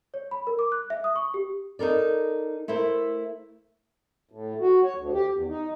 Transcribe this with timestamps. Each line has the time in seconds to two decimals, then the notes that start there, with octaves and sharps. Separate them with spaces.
0.14 C#5
0.31 B5
0.47 A#4
0.59 D6
0.72 F#6
0.90 E5
1.04 D#6
1.16 C#6
1.34 G4
1.79 D#4 A4 A#4 D5
2.68 A3 E4 A#4 C5
4.31 A2
4.61 F#4
4.84 C#5
4.97 D2
5.13 G4
5.32 E2
5.48 D#4